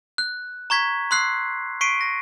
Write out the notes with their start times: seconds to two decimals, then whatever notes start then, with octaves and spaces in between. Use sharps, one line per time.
0.18 F#6
0.70 A#5 C#6 G#6 B6
1.11 C6 E6 F#6 C7
1.81 C#6 B6 C7 D7 D#7
2.01 A#6